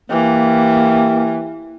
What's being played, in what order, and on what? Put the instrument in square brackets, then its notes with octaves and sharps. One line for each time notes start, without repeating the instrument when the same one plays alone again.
[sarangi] E3 [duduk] A#3 [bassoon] G4